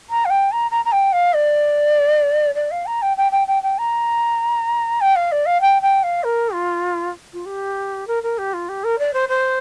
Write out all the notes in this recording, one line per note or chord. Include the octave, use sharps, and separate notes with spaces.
A#5
F5
G5
A#5
A#5
A#5
G5
F5
D5
D5
F5
A#5
G5
G5
G5
G5
G5
A#5
G5
F5
D5
F5
G5
G5
F5
A#4
F4
F4
G4
A#4
A#4
G4
F4
G4
A#4
D5
C5
C5